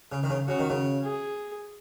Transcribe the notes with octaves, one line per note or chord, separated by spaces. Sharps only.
C#3
D#3
C#3
C#3 F#4
D#3
C#3
G#4